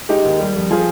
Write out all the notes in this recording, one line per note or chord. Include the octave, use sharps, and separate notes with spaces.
G#3 D#4 G4
D#2
G3
F2
F3 F4 G#4